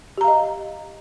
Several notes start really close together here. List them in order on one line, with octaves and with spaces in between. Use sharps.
G4 A#5 F5 D#5